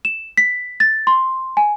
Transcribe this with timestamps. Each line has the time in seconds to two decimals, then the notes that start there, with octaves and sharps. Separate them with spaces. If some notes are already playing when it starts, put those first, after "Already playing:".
0.05 E7
0.37 B6
0.80 A6
1.07 C6
1.57 G#5